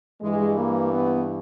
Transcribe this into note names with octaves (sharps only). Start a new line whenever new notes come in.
G2 E3 G#3
A#3
B3